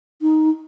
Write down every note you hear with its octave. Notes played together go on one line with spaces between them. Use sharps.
D#4